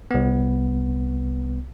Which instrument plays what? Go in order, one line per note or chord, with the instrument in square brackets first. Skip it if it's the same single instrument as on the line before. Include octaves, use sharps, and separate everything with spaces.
[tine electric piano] C2 B3